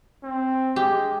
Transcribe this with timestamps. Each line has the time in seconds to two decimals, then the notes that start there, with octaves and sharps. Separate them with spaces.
0.24 C4
0.76 G#3 G4